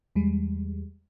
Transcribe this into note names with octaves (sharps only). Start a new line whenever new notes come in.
E2 G3 G#3